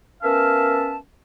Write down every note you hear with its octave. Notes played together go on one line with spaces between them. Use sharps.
B3 C#4 A#4 E5 F5 A5